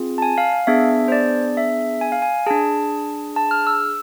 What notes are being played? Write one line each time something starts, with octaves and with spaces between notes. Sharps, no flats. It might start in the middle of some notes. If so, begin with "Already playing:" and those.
Already playing: C4 F4 G#4
A5
G#5
F5
F5
B3 D4 G#4 E5
C5
D5
E5
G#5
F5
G#5
D4 G#4 A5
A5
F6
E6